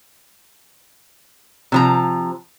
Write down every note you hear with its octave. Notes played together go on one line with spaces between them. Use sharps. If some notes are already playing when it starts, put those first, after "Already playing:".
C3 F3 A#5